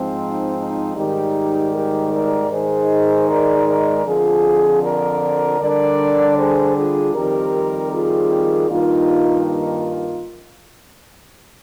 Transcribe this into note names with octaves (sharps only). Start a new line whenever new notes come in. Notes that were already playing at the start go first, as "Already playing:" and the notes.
Already playing: G#2 F3 C4
D#4
D#4
G#2 D#3 G3 D#4 G4
G4 A#4
A#4 D5
G#2 D#3 G#3 D#4 G#4 C5
A#4 D5
A#4 D5
F2 D3 F3 F4 G#4
A#4 D5
D3 G3 D4 A#4 D5
G#4 C5
F4 G#4
F2 D#3 G3 C4 G4 A#4
F4 G#4
G2 D#3 A#3 D#4 F4
F4